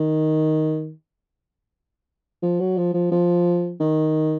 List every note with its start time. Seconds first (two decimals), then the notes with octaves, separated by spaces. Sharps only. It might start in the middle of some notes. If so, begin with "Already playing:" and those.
Already playing: D#3
2.42 F3
2.60 F#3
2.77 F3
2.94 F3
3.12 F3
3.80 D#3